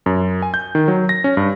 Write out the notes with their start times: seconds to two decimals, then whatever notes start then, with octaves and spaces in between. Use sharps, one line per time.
0.06 F#2
0.42 G#5
0.54 G6
0.75 D#3
0.88 F#3
1.09 A#6
1.24 C#4
1.37 G2